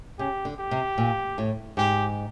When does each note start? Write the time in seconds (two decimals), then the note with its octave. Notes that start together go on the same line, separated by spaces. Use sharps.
0.19 C#3 G4
0.45 D3
0.59 G4
0.71 C3
0.98 A#2
1.38 A2
1.77 G#2 G4